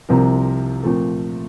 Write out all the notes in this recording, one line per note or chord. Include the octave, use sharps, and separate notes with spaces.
C2 C3 F3 C4 A#4
A#2 F3 A3 C4 A4